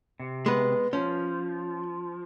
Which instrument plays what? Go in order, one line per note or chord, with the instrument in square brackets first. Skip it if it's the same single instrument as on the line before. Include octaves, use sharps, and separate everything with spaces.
[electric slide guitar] C3
[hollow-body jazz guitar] G#3 B3 B4
[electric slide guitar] F3 [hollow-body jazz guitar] C#4